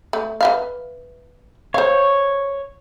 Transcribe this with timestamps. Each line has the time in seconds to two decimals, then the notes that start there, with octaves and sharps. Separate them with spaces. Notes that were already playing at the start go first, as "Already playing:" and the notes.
0.13 A3
0.41 B4 E5 F5
1.74 C5 C#5 F5